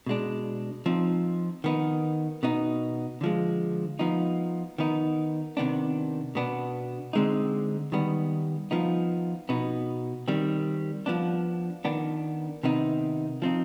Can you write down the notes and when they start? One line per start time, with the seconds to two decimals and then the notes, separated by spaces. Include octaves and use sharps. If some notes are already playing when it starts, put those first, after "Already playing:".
0.06 B2 G#3 D4
0.86 F3 C4 D#4
1.64 D#3 B3 D#4
2.43 B2 B3 D#4
3.21 D3 F3 G#3
3.99 F3 B3 D#4
4.78 D#3 B3 D#4
5.57 C3 D#3 B3 D4
6.35 B2 B3 D4
7.13 D3 G#3 C4 D#4
7.92 D#3 G3 B3
8.71 F3 B3 D#4
9.49 B2 B3 D#4
10.28 D#3 G3 C4
11.06 F3 B3 D4
11.85 D#3 B3 D4
12.63 C3 D#3 B3 D#4
13.42 F3 C4 D#4